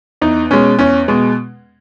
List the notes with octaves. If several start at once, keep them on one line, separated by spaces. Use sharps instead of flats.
E2 D#4
B2 G#3 C#4
E2 C#4
B2 G#3